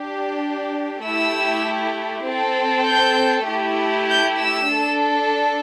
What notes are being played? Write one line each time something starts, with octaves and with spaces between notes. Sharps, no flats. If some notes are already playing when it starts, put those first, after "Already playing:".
Already playing: D4 G4
A3 E4 G4 E6
C4 A4
G6
A3 E4 G4
G6
E6
D4 A4